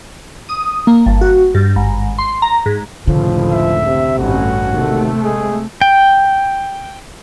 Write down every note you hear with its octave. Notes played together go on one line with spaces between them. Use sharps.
D#6
A#3
G1
F#4
G2
G#1
C6
A#5
G#2
F1 C#2 A2 D3 F3
E5
C3
A1 G2 C#4 F#4
D#2 C3 A3
G#3 G#4
G5